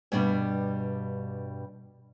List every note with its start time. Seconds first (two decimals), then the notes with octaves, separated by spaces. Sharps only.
0.12 G2 B2 G3 B3 D4